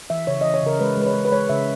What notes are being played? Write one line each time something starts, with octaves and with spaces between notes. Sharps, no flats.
E3 E5
C#3 C#5
E3 D#5
C#5
C#3 A#4
G#3 B4
G#3 B4
C#5
G#3
B4
G#3 C#5
C#3 E5